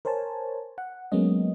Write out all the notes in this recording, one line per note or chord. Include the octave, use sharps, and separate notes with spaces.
A#4 C5 C#5 G#5 A5
F#5
F#3 G#3 A#3 B3 C#4 D#5